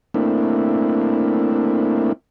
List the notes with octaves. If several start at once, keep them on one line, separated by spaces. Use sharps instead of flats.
A3 A#3 C4 D4 E4